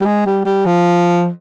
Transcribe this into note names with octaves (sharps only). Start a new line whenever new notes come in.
G3
G#3
G3
G3
F3